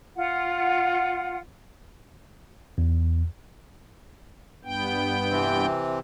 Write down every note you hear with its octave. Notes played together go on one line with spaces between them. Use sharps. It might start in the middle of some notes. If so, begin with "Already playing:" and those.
F4 F#5
E2
G2 B3 G5
C3 E3 C4